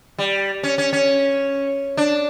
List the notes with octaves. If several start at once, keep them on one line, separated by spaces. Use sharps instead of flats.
G3
C#4
C#4
C#4
D4